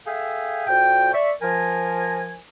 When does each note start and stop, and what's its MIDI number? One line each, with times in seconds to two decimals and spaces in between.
0.06 0.64 68
0.06 0.64 69
0.06 0.64 76
0.06 0.64 77
0.06 0.64 79
0.06 0.64 80
0.67 1.09 41
0.67 1.09 46
0.67 1.09 66
0.67 1.09 79
1.14 1.31 74
1.14 1.31 76
1.14 1.31 85
1.42 2.38 53
1.42 2.38 70
1.42 2.38 80